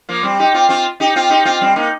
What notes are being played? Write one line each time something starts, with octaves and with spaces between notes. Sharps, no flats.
F3 A#3
G3 C4
D#4 G4
C4 F4
C4 F4
D#4 G4
C4 F4
D#4 G4
C4 F4
G3 C4
A#3 D#4